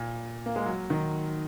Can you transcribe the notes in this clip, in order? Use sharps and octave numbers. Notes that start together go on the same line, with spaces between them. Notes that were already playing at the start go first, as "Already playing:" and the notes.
Already playing: A#2
A#3
G#3
F#3
D#3